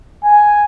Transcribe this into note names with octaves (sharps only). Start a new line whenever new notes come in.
G#5